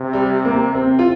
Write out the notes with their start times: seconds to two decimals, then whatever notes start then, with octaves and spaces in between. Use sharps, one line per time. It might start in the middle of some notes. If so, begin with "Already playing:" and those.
Already playing: C3
0.13 G3
0.45 A#3
0.75 C4
0.99 F4